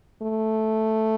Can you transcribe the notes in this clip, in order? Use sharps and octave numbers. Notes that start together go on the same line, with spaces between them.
A3